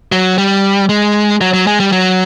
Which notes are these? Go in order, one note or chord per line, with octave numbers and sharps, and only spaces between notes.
F#3
G3
G#3
F#3
F#3
G#3
G3
F#3